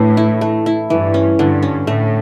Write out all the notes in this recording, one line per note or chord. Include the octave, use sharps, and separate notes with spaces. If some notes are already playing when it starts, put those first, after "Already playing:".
Already playing: A2 E3 D4
E4
A3
E4
G2 E3
C#4
G2 D3
C#4
A2 A3